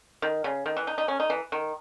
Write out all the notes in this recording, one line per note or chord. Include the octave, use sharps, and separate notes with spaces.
D#3
C#3
D#3
E3
D#4
D#4
C#4
D#4
E3
D#3